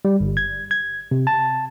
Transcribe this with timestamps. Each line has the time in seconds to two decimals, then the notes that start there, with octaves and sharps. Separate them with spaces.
0.05 G3
0.20 G1
0.37 G#6
0.71 G#6
1.11 C3
1.27 A5